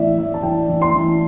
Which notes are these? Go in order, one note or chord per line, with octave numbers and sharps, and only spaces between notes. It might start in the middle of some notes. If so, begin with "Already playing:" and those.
Already playing: A2 E3 D5 E5
E3 E5
A5
E3 G5
E3
C6
E3